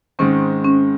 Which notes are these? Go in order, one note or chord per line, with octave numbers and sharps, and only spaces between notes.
G#2 D#3 G#3 C4 C#4
C#4